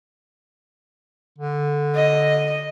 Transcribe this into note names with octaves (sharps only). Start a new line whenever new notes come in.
D3
D#5